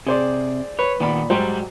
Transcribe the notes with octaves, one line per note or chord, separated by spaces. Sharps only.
C3 G#4 C5 D5
B4 C#5
A#2 D#3 B3 D5 B5
G#2 F#3 G3 G4 C5